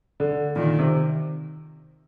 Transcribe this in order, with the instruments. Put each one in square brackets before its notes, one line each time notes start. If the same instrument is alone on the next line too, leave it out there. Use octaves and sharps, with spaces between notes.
[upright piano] D3
[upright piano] A#2 [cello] D#3
[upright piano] C3